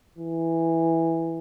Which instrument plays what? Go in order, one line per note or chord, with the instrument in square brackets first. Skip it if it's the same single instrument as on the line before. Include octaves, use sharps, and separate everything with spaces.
[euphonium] E3